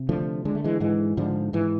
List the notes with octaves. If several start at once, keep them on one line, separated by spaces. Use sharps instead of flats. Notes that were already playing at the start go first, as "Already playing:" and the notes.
Already playing: C3
D3 F3 A3
D3 G#3
A3
E3 G#3
G#2 E3 G#3
G#2 D3 F3
G#2 E3